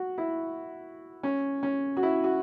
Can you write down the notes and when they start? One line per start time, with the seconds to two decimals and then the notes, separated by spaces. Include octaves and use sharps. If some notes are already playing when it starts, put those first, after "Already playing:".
Already playing: F#4
0.18 E4
1.23 C#4
1.63 C#4
1.97 F#4
2.03 E4
2.24 F#4